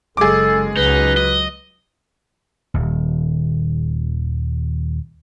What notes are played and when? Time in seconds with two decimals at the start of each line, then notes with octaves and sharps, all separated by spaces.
0.17 F#1 G#3 G#4 A4 D6
0.77 C#2 F#3 D#4 B4
1.17 D#5
2.74 D#1 D#2